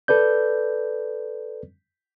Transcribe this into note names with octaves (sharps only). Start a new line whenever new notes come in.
A4 B4 D5 G6